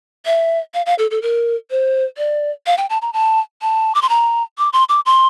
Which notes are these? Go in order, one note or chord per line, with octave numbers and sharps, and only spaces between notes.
E5
F5
F5
A4
A4
A#4
C5
D5
F5
G5
A5
A#5
A5
A5
D6
C6
A#5
D6
C6
D6
C6